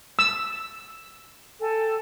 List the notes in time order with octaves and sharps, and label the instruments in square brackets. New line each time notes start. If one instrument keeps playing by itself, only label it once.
[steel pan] E6
[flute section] A4 G5 G#5